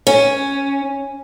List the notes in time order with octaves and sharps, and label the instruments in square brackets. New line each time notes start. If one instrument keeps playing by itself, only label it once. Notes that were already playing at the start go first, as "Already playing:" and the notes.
[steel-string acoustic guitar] C#4